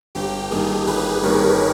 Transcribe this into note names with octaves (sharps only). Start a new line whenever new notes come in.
G1 G4
G2 D#3 A#3 G#4
G1 G#4 B4
G2 D#3 A#3 A#4 C#5